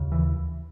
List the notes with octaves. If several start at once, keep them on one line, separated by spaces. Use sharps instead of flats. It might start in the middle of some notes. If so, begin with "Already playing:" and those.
Already playing: D#2 C#3
E3